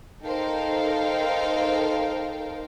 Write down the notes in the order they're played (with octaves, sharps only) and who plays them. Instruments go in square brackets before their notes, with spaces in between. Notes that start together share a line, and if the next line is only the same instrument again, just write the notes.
[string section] D#4 A4 A#4 C5 F5 G5